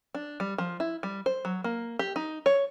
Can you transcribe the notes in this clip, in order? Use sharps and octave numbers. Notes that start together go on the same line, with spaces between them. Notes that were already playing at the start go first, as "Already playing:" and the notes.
D4
G3
F3
E4
G3
C5
F#3
A#3
G4
D#4
C#5